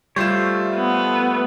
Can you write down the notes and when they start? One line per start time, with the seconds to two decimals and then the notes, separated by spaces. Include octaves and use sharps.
0.16 G3 A3 F4 C5 C#5 E7
0.75 B3